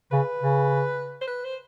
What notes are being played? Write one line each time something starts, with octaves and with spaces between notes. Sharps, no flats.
C#3 B4
C#3
C5
B4
C5